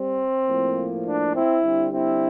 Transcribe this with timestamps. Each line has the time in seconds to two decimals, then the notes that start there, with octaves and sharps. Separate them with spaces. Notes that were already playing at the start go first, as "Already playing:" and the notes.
Already playing: G3 C4
0.47 A2 F3 A#3
1.05 D4
1.34 C4 E4
1.62 D3 G3 C4
1.91 C4 E4